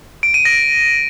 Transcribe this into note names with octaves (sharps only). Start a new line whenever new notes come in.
D7
D#7
A#6